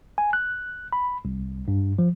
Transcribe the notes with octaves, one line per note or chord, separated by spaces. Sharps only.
G#5
F#6
B5
C2
G2
F3